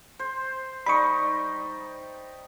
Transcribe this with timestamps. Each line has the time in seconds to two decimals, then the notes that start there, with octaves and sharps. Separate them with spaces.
0.19 C5
0.86 G3 D#4 B5 C#6